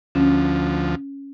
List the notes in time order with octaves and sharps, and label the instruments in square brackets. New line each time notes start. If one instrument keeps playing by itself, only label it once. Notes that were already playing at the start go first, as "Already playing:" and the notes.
[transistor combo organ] D2 F3 [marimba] C#4